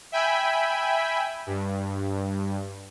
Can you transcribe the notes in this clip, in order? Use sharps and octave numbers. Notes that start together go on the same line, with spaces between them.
E5 G5 G#5 B5
G2